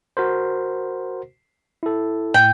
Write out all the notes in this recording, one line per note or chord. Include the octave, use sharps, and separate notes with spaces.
F#4 A#4 C5
E4 A4
A2 G5